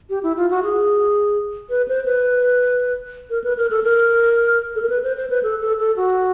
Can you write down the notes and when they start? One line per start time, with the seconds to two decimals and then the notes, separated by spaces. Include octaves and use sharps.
0.10 G4
0.23 E4
0.37 F4
0.51 F#4
0.63 G#4
1.70 B4
1.88 C5
2.06 B4
3.30 A#4
3.44 B4
3.57 A#4
3.71 A4
3.84 A#4
4.75 A4
4.82 A#4
4.90 B4
5.03 C5
5.17 C5
5.30 B4
5.43 A4
5.61 A4
5.79 A4
5.97 F#4